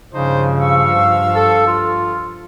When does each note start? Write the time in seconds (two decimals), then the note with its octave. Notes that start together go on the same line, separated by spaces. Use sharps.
0.14 G2 C#3 F3 D4 D#4 C5
0.60 F5 C#6 E6
1.36 A4
1.67 F4